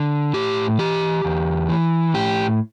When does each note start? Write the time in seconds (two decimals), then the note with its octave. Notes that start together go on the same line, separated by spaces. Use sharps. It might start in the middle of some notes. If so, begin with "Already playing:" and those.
Already playing: D3
0.34 A2 G4
0.79 E3 G4
1.25 E2
1.69 E3
2.14 A2 G4